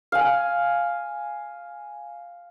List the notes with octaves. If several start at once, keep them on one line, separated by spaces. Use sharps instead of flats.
F5 G#5